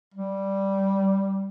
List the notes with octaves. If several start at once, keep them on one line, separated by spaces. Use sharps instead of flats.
G3